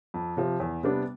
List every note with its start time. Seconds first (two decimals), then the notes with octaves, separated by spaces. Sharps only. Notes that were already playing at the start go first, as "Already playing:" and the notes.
0.14 F2
0.37 C3 F3
0.60 E2
0.83 C3 G3 B3 D4